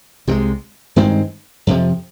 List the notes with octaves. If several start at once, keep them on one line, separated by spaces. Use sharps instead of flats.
C2 C3 D#3 G#3
G2 D#3 G#3 C4
F2 C3 F3